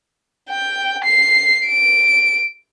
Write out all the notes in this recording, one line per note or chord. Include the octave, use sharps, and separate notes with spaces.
G5
C7
D7